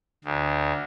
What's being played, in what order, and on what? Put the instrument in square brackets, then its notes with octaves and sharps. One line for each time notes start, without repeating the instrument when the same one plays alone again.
[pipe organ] D2